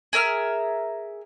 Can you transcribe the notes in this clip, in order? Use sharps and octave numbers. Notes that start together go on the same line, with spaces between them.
G#4 A#4 E5 F6